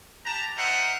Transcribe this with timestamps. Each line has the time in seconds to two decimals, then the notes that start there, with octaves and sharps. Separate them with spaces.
0.25 G4 B4 A5 A#5
0.57 D#4 A#4 C5 E5 F#5